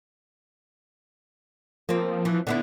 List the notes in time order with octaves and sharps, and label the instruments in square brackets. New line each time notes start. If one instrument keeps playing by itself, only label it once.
[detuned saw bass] F3 [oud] A#3 C4
[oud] E3
D3 B3 E4